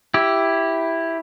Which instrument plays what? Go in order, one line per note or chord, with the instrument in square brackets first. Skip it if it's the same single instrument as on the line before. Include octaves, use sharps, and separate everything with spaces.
[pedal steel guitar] E4 G4